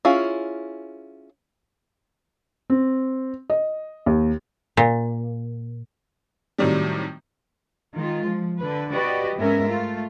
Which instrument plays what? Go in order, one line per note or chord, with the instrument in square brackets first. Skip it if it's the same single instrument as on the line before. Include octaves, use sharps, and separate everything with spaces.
[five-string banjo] C#4 E4 F4 G#4
[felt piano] C4
D#5
D#2
[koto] A#2
[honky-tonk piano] A2 C3 D#3 F#3 G3
[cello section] D#3 G#3 F4
F3
D3 B4
F#4 G4 B4 D5 D#5
G#2 B3 C#4 A#4 E5
A3 F4